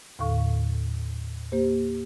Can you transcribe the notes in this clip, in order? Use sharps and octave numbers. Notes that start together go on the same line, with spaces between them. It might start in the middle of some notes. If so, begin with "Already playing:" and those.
D#2 A2 D3 A4 F5 C#6
A#3 G4 C5